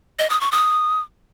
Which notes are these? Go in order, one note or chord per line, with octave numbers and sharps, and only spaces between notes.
D#5
D#6
C#6
D#6